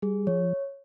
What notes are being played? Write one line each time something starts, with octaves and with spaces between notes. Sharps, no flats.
G3 G#4
F3 C#5